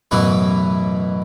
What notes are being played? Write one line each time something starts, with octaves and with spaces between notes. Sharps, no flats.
A1 F#2 B2 E3 E4 B4